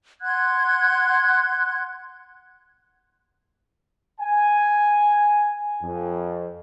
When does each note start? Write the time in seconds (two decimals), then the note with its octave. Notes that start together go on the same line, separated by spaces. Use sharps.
0.21 F#5 C6 F#6 G#6
4.21 G#5
5.82 F2